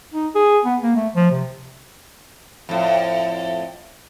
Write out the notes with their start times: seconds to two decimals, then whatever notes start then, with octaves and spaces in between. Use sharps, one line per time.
0.13 D#4
0.35 G#4
0.65 B3
0.83 A#3
0.96 A3
1.15 F3
1.31 C3
2.69 F2 A2